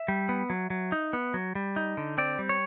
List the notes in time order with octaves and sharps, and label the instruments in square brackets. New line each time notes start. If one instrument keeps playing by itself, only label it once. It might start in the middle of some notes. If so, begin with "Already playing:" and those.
Already playing: [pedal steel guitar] E5
G3
B3
F#3
F#3
D#4
B3
F#3
G3
D#4
D3
C4 D5
G3
C#5